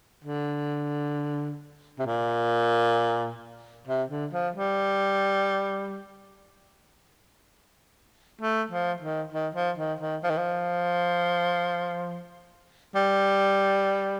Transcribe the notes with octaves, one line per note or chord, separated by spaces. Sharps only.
D3
C3
A#2
C3
D3
F3
G3
A3
F3
D#3
D#3
F3
D#3
D#3
F3
D#3
F3
G3